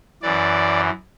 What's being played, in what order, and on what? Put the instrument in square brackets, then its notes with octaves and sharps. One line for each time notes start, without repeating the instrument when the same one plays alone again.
[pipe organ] F#2 E3 D5